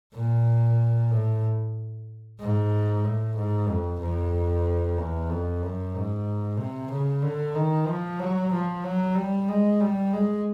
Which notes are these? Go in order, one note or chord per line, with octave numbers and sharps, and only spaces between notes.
A#2
A2
G#2
A2
G#2
F2
F2
E2
F2
F#2
G#2
C3
C#3
D3
D#3
F3
F#3
F3
F#3
G3
G#3
G3
G#3